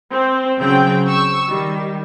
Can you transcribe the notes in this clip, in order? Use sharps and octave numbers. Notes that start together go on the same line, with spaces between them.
C4
C#3 F#3 C4 G5
C#6 E6
D#3 G3